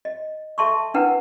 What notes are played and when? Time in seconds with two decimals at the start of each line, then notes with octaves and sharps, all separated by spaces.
0.05 D#5
0.58 A4 E5 A5 C6 C#6
0.94 D4 E4 A#4 B4 F#5